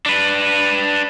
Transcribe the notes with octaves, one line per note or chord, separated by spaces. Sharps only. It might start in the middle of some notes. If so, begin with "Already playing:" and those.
D4 B4